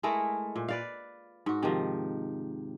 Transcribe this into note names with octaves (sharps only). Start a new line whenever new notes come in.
G#3 A3 E4 A#4
A#2
B4 D5 F5
G#2 F#4
C3 D#3 F3